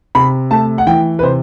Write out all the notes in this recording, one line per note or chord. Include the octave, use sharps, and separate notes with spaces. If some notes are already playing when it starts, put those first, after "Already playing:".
C3 B5
A3 A5
F#5
E3 G5
B4
C3 C5